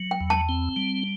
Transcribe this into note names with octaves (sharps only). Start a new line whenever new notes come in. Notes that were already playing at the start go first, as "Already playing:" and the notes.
Already playing: F#3
G5
E2
A5
C4
G3